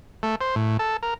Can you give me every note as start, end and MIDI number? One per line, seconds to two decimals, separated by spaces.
0.23 0.35 57
0.41 0.55 72
0.56 0.77 45
0.79 0.97 69
1.03 1.14 70